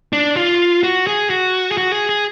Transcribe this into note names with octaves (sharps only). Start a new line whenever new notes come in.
D4
F4
F#4
G#4
F#4
G#4
F#4
G#4
G#4